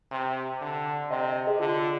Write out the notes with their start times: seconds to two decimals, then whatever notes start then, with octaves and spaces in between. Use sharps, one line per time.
0.11 C3
0.61 D3
1.10 C3 D#5
1.23 D#5
1.35 D#5
1.47 G#4
1.59 D3 F4